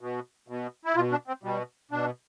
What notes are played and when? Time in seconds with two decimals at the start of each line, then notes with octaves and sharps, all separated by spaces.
0.01 B2
0.48 B2
0.85 E4
0.96 B2 F4
1.11 D4
1.28 C4
1.43 B2 G3
1.91 B2 D4